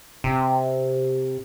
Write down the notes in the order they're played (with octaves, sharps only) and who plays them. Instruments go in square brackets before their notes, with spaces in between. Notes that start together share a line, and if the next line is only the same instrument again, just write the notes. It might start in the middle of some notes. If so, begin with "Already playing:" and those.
[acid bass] C3